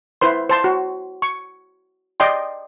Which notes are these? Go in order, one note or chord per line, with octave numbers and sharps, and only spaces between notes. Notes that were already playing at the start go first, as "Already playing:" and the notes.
E4 B4 C5 C6
C5 A5 C6
F#4
C#6
D5 D#5 G5 C6